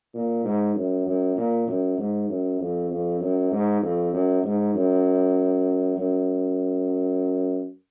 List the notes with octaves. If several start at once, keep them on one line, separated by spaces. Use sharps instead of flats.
A#2
G#2
F#2
F#2
A#2
F#2
G#2
F#2
F2
F2
F#2
G#2
F2
F#2
G#2
F#2
F#2